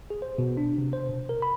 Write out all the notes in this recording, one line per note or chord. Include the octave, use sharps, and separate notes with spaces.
G#4
C5
B2
D4
C3
C5
B2
A#4
B5